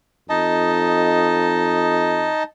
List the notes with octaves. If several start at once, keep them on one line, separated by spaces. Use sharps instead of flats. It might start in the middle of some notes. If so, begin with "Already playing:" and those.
F2 D#4 D#5 A5